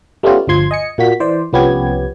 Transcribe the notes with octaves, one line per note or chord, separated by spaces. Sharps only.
G3 A3 B3 C#4 F4 G4
G1 D2 F3 C6 G#6
D#5 G#5 C#7
A#2 A#3 F#4 B6
E3 C5 D5
C2 F3 B3 C#4 G4 G#6